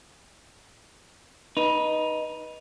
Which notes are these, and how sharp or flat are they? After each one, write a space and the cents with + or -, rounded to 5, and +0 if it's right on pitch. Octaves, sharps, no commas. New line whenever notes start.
D#4 +0 B4 -20